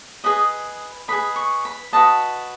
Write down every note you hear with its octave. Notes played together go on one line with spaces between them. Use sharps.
G#4 B4 D#5 B5
G#4 B4 D#5 B5
C#6
B5
F#4 B4 D#5 A5